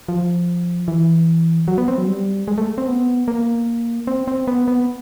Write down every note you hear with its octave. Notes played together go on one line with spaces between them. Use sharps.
F3
E3
F#3
B3
C4
F#3
G3
G#3
A3
C4
B3
A#3
C4
C4
B3
B3